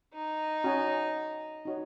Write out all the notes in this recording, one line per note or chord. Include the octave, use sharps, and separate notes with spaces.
D#4
C#4 F#4 D#5 G#5
D#4 F#4 C#5